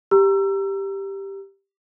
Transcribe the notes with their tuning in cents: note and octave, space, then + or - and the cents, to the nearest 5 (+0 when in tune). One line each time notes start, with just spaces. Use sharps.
G4 +0 A#5 +0 E6 +30